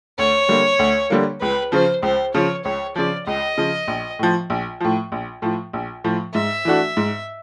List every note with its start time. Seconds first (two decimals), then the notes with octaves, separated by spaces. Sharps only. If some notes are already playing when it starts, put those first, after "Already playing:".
0.18 D2 C#5
0.49 D3 G3 A#3
0.79 D2
1.10 D3 G3 A#3
1.41 C#2 B4
1.72 C#3 F3 C5
2.03 C#2 C5
2.34 C#3 F3 C#5
2.65 C#2 C#5
2.95 C#3 F3 D5
3.26 C#2 D#5
3.58 C#3 F3
3.88 A#1
4.19 A2 F3
4.50 A#1
4.80 A2 F3
5.12 A#1
5.42 A2 F3
5.73 A#1
6.04 A2 F3
6.35 G#2 E5
6.65 E3 A3 D4 F#4
6.97 G#2